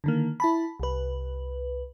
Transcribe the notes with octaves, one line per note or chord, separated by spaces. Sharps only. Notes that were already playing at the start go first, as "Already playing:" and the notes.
D3 D#3 A#3
E4 A5 B5
C2 B4